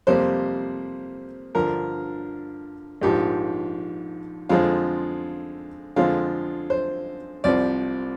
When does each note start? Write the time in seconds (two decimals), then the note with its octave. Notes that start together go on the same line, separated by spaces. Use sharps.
0.07 F2 C3 G3 A#3 C5
1.55 G2 D3 F3 A#4
3.01 A#1 G#2 F3 G4
4.49 F2 D3 G#3 C4 F4
5.96 F2 D3 G#3 C4 F4
6.70 C5
7.44 C2 C3 F3 C4 D5